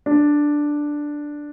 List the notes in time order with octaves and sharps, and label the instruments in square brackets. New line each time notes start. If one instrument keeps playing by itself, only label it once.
[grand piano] D4